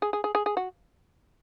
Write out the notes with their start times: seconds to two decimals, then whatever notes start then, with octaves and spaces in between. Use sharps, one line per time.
0.02 G#4
0.13 G#4
0.24 G#4
0.35 G#4
0.46 G#4
0.57 F#4